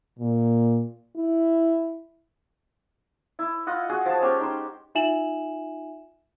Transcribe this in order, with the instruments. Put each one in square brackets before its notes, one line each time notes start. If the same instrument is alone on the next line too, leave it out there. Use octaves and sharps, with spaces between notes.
[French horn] A#2
E4
[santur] E4
F4 D#5 F#5
F#4 G#4
F3 A5
G#3 C#4 G4 G5
D#4 C5
[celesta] D#4 F4 E5 G#5 E7 F#7